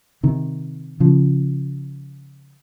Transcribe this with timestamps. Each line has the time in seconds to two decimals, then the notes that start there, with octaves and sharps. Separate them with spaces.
0.23 C3 D#3
1.00 C#3 F3